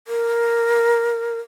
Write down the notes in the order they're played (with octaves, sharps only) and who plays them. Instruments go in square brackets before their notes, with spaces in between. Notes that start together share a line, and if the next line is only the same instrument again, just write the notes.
[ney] A#4